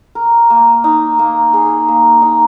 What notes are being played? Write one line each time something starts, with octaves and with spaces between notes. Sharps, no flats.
A#4
A#3
D#4
A#3
G#4
A#3
D#4